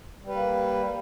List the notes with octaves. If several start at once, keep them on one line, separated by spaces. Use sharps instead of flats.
G3 A#3 B4